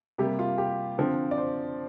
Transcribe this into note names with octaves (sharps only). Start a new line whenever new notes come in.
C3 G3 A#3 G4
F4
G4
D3 F3 C4
D5
C5